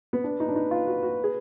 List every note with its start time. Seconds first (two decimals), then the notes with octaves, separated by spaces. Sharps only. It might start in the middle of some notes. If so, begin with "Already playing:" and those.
0.13 B3
0.24 D4 B4
0.40 D#4
0.48 D4
0.56 D#4
0.71 F4
0.87 F#4
1.03 F#4
1.24 G#4